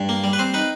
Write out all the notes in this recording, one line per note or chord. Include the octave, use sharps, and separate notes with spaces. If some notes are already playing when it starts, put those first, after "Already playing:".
Already playing: G2
A#3
G3
B4
C4 C5
D#4 B4